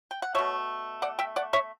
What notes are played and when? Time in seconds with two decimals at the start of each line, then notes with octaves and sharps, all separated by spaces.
0.11 G5
0.22 F#5
0.35 B2 A3 C#5 E5
1.02 D5 F#5
1.19 E5 G5
1.36 D5 F#5
1.53 C#5 E5